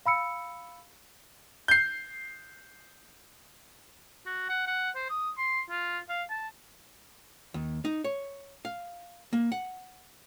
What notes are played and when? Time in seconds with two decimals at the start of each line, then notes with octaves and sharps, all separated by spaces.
0.06 F5 B5 E6 C#7
1.68 G6 C7
4.26 F#4
4.49 F#5
4.67 F#5
4.96 C5
5.10 D#6
5.38 C6
5.70 F4
6.09 F5
6.30 A5
7.54 D#2
7.85 D#4
8.04 C#5
8.65 F5
9.33 A#3
9.52 F#5